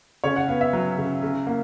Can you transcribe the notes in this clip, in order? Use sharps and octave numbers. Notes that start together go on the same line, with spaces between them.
C#3 C#5
F#5
B3 F5
E5
F#3
C#3
C#3
A#3